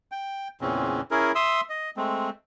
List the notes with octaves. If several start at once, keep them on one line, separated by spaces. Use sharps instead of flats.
G5
E2 A#2 C#3 E3 C4 C#4
C#4 E4 G#4 A#4
E5 C6 D#6 E6
D#5
G#3 A3 C4